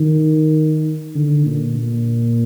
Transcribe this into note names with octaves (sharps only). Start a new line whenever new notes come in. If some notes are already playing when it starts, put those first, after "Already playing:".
Already playing: D#3
D3
A#2
A#2